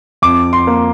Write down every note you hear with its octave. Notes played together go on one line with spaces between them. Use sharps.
F2 D6
C6
A#3